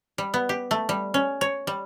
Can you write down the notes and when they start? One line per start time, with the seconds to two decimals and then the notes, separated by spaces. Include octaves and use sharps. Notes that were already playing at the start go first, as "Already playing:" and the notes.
0.18 G3
0.34 B3
0.49 G4
0.71 A3
0.89 G3
1.14 C#4
1.41 C#5
1.67 G3